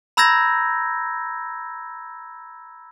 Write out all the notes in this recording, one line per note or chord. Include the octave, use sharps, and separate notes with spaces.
A#5 B5 E6 G6 G#6 A#6